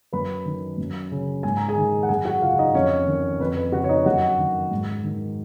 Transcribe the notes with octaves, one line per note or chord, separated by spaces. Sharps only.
F#2 B4 B5
D#3
F#2
C#3
G#2 G#5
A#5
G#4 G#5
D#3
F#5
F#2 G#4 G#5
F#4 F#5
C#3 F4 F5
D#4 D#5
F2 C#4 C#5
D#3
F2 B4
B4
C#3 F#4 F#5
C#5
D#4 D#5
F#2 F#4 F#5
D#3
G#2
D#3